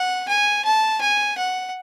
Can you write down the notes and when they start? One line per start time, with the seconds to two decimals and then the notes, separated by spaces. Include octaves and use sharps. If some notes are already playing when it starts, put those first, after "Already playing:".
Already playing: F#5
0.28 G#5
0.65 A5
1.01 G#5
1.38 F#5